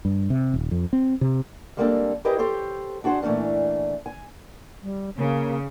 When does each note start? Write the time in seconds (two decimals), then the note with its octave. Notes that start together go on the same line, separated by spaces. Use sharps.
0.05 G2
0.30 C3
0.54 D#1
0.71 F2
0.93 C4
1.21 C3
1.77 G3 G#3 A#3 C4 D4 A4
2.25 E4 G4 G#4 A#4 B4 D#5
2.38 G4 A4 C5 C#5
3.04 D4 F#4 G#4 C5
3.22 A#2 E3 A3 C#4 D4
4.06 G#5
4.82 G3
5.17 C#3 A#3